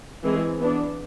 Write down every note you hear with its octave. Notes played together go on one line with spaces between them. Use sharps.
E3 G#3 C4 G#4
E3 B3 D4